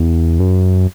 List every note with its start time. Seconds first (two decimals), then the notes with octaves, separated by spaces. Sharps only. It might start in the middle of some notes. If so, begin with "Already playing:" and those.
Already playing: E2
0.40 F#2